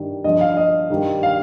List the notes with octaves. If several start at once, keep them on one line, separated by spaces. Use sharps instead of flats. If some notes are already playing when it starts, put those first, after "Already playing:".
Already playing: G2 D#3 G3
G2 F3 D#5
F5
D#5
G2 D#3 G3
F5